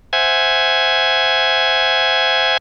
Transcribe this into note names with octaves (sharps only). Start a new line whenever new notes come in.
C5 E5 F#5 G#5 G#6